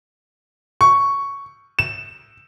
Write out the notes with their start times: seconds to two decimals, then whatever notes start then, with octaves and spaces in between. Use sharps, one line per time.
0.81 C#6
1.79 E7